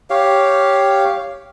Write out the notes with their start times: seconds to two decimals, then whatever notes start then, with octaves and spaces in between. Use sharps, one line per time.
0.10 G4 C#5 F5